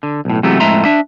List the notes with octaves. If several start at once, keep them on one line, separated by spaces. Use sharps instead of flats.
D3
B1 A2
C3 E3 F#3 G#3 A3 B3
F2 A2 G#3 E5 A#5 C6
D4 E5